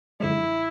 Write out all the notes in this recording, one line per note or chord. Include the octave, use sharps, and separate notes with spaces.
F#2 D3 F3 G#3 E4